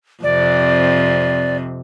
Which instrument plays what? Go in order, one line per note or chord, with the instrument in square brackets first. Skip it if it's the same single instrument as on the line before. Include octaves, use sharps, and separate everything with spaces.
[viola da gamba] F2 C3 [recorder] D5